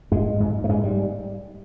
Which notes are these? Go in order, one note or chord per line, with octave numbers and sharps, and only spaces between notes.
G#2 G#3
G#2
A3
G#2 G#3
G3